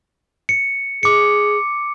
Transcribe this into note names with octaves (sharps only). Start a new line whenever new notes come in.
C#7
G#4 D6 C#7